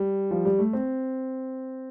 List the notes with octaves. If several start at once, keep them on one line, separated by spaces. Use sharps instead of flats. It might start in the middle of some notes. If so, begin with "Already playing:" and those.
Already playing: G3
F3
G3
A3
C4